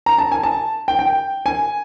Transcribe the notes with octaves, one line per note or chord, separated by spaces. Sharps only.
A#5
A5
G#5
A5
G5
G5
G#5